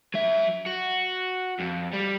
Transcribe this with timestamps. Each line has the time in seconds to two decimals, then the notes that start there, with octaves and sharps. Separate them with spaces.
0.14 F#3 E5
0.66 F#4
1.59 F2
1.93 G3